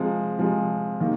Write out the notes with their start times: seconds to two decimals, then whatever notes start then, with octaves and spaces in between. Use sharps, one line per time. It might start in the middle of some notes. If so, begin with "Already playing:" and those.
Already playing: C3 F3 G#3
0.38 C3 F3 G#3
1.00 D#3 A#3